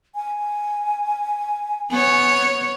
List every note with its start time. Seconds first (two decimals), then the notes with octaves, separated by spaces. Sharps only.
0.15 G#5
1.91 B3 C#5